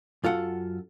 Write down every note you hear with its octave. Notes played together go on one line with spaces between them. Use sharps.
F#2 F4 A4 F#5